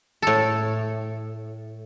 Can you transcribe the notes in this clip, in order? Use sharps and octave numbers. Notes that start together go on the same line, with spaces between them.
A2 A4